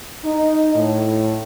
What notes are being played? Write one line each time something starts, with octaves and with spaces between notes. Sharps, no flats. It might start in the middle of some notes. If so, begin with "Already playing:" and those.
D#4
A2